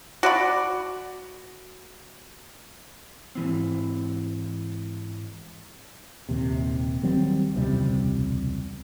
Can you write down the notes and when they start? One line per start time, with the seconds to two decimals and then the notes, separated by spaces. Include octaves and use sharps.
0.23 F#4 D5 B5
3.35 G#2 E3 C4
6.29 D#1 D#2 C3
7.03 D#3 F#3 G3 C4
7.55 E1 C#2 C3 G3